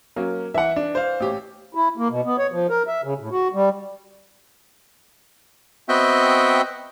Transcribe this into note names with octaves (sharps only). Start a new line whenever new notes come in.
F#3 A#3 C#4 A#4
E3 E5 F#5
D4
C5 F5
A1 G4 C#5
E4
A#3
B2
B3
C#5
F3
A#4
E5
C#3
A2
F#4
G3
B3 C4 F#4 D#5 E5 G5